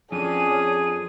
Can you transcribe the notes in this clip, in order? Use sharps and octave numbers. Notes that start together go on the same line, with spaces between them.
F2 C#4 D4 G#4 D#7